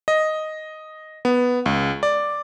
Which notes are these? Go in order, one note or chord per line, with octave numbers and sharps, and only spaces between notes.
D#5
B3
C#2
D5